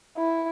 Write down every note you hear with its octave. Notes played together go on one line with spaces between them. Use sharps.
E4